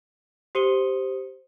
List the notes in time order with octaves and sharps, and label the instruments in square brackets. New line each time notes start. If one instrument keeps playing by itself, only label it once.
[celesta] G4 C5 D#6 C#7 D#7 G7